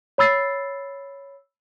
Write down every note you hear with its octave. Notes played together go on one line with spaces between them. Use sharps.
C#5 B5 E6 A6 C7